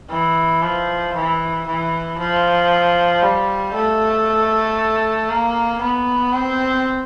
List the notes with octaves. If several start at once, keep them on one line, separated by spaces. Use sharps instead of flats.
E3
F3
E3
E3
F3
G3
A3
A#3
B3
C4